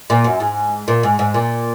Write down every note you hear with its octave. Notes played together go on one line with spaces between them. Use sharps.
A#2
F#2
G#2
A#2
G#2
G#2
A#2